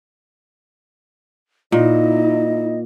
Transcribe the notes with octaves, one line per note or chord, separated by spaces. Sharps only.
A#2 D#4 E4 D#5